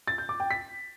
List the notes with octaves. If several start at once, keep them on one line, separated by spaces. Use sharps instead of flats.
A6
G6
D6
G5
B6